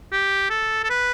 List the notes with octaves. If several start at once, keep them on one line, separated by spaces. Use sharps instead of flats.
G4
A4
A4
B4